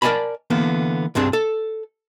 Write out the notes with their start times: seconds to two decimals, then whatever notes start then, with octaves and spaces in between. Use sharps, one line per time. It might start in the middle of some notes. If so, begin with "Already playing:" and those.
0.02 A#4 D5 D#5 G#5 A5 B5
0.50 D3 E3 A#3 B3
1.15 C2 G2 C4 D4 G#4
1.33 A4